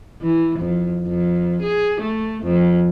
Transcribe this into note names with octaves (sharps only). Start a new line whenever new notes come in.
E3
F2
F2
G#4
A3
F2